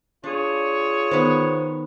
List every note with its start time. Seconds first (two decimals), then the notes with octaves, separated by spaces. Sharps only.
0.24 D4 F4 G#4 C#5
1.11 D#3 B3 C5